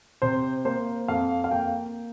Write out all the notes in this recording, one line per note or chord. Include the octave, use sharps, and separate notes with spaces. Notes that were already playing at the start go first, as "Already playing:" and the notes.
C3 C5
A#3 C5
F2 F5
F5
A#3 G5